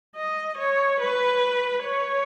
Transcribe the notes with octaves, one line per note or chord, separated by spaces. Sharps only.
D#5
C#5
B4
C#5